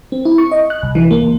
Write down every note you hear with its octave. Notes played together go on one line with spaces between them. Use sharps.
C4
E4
C#6
D#5
F#6
C2
E3
A#3
C#2